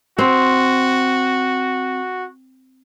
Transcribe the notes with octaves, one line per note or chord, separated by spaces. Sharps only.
C4 F#4